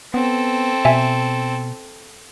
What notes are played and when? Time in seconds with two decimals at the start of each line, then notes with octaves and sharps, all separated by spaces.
0.14 B3 C4 A4
0.85 B2 E5 G#5